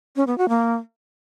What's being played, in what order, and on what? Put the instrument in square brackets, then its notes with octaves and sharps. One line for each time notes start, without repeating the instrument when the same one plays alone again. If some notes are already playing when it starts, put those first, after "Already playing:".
[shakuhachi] C#4
B3
F#4
A#3